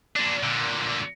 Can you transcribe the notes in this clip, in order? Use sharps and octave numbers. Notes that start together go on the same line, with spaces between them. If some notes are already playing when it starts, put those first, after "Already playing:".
A#2 D4
A#2 D3